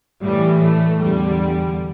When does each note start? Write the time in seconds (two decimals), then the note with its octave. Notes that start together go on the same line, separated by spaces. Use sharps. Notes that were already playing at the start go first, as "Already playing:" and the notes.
0.23 A2 E3 G3
0.61 A3
1.00 E2 D3 G3